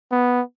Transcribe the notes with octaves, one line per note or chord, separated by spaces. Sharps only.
B3